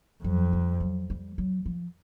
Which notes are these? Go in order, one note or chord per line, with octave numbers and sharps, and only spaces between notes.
F2 F#3
G3
F#3
G3
F#3
F3